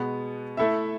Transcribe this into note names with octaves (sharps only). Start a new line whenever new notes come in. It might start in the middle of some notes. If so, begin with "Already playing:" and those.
Already playing: B2 G#3 B3
A3 E4 A4 E5